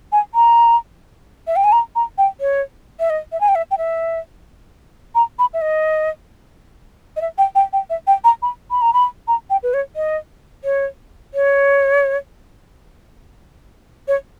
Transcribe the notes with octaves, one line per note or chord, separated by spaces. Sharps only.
G#5
A#5
E5
G5
G#5
A#5
A#5
G5
C#5
E5
D#5
E5
G#5
G5
E5
G5
E5
A#5
B5
E5
D#5
D#5
E5
G5
G5
G5
E5
G5
A#5
B5
B5
A#5
B5
A#5
G5
B4
C#5
D#5
C#5
C#5
C#5